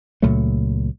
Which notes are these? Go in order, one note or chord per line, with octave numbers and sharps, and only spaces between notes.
C#2 A#2 F#3 A3